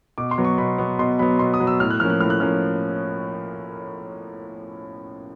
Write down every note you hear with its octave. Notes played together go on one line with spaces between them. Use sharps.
B2 D6
C6
F#3 B3
C#6
B2 B5
F#3 B3
B2 C6
F#3 B3 B5
B2 C6
D#6
F#3 B3
E6
A2 F6
F#6
F3 A#3 C#4 F6
F#6
A2 F6
F#6
F3 A#3 C#4 F6